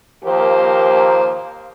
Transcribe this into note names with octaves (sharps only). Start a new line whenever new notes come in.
D#2 F3 A#3 G4 A#4 C5